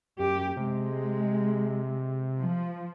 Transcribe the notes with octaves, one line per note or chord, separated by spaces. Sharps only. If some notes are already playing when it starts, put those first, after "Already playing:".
F#2 G4
C3 G#3
F3